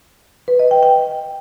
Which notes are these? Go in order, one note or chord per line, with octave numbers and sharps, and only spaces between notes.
B4
D#5
G5
G5